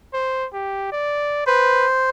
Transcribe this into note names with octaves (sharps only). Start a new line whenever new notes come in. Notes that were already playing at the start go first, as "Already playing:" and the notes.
C5
G4
D5
B4 C5